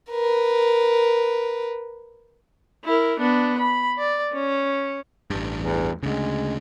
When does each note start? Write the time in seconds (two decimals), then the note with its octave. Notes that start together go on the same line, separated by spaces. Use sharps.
0.10 A#4 B4
2.85 E4 A#4
3.20 B3 D4
3.58 B5
3.98 D5
4.33 C#4
5.30 A1 G2
5.57 E2
6.03 D2 C#3 G#3